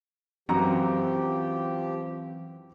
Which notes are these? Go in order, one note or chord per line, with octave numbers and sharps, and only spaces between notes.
F#2 E3 F3 C4 F#4 G4 A#5